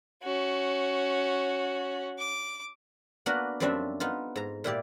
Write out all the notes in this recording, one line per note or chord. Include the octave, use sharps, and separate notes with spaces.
C#4 F#4
D6
A#3 B3 D4 F#4 A#4 B4
F#2 F3 G3 C4 D4 E5
B3 D#4 F4
G#2 A#5
A#2 E4 G4 D5